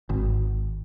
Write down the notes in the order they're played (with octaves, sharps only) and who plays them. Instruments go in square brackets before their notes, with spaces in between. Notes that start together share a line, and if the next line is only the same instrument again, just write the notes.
[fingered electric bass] G#1